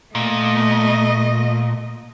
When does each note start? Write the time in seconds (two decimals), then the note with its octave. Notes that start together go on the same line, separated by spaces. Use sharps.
0.15 A#2 A3 D#5